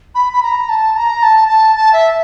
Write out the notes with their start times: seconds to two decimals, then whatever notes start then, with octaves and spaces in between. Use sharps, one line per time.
0.15 B5
0.33 B5
0.43 A#5
0.69 A5
0.96 A#5
1.22 A5
1.48 A5
1.76 A5
1.93 E5